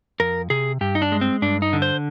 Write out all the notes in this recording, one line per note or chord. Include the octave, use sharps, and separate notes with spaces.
F2 A#4
C3 G#4
G2 G4
D#4
D4
G#3
C4
G2 D4
D#4
D3
C5